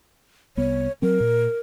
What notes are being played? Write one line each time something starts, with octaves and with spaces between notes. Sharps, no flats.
C2 B3 C#5
F#3 C4 A#4
A#2